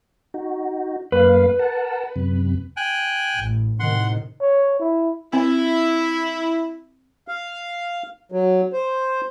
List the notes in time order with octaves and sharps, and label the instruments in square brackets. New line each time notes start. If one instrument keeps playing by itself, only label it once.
[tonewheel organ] D#4 F#4
[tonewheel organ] F#2 A#3 F5 [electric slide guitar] B4
[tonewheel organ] A#4 F#5 A5
F#2 C3
[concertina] G5 G#5 F#6
[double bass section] A1
[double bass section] A2 C3 D#3 [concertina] F#5 C6
[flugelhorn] C#5
E4
[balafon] C4 [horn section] E4
[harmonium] F5
F#3
C5